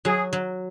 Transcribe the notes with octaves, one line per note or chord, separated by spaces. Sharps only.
F#3 G#4
F#3